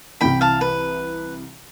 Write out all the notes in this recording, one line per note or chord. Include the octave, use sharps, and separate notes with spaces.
C2 C3 E3 G5 B5
F5 A5
B4